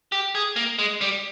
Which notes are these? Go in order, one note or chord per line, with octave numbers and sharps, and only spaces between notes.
G4
G#4
A#3
G#3
G3